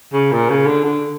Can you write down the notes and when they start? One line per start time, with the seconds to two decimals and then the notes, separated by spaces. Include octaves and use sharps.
0.13 C#3
0.32 A#2
0.50 C#3
0.66 D3
0.84 D3